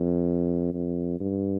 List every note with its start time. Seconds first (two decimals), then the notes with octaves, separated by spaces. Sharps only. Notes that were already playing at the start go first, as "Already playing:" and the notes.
Already playing: F2
0.74 F2
1.20 G2